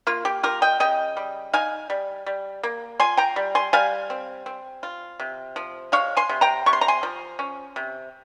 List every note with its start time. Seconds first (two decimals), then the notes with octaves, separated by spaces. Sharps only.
0.07 A#3 F4
0.25 G4
0.43 F4 G4 A#4
0.62 D#5 G5
0.80 C#3 D#5 G5
1.17 G3
1.53 D#4 F5 G#5
1.90 G3
2.26 G3
2.63 A#3
3.00 F4 G#5 C6
3.17 G5 A#5
3.36 G3
3.55 G#5 C6
3.73 G3 F5 G#5
4.10 C4
4.46 C4
4.83 F4
5.20 C3
5.56 F3
5.92 G#3 C#5 F5
6.17 G#5 C6
6.29 C3
6.41 G5 A#5
6.66 C3 C#6
6.73 C6
6.81 A#5
6.88 G#5 C6
7.03 F3
7.39 C#4
7.76 C3